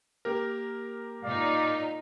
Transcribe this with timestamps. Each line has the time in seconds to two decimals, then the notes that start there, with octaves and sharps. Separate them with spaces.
0.25 A#3 G4 A#4
1.24 A#2 D#4 D5 F5